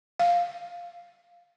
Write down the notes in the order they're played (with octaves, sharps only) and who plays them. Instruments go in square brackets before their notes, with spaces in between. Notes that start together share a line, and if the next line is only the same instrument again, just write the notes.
[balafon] F5